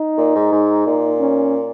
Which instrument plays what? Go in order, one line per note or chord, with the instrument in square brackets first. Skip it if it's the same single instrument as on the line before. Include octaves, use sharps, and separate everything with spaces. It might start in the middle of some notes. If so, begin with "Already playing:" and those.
Already playing: [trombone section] D#4
[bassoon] A#2
G#2
G#2
A#2
[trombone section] C#4